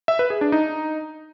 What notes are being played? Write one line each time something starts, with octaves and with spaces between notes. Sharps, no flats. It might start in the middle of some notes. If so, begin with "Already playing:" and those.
E5
B4
G#4
D4
D#4